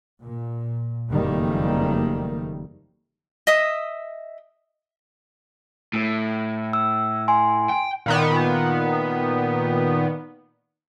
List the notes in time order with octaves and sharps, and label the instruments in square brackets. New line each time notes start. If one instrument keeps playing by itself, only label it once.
[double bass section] A#2
F#1 F2 D#3 G3 A3 A#3
[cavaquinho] D#5 E5 D#6
[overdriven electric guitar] A2
[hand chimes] E6
G#5 C6
[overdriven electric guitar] G5
[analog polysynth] A#2 D#3 B3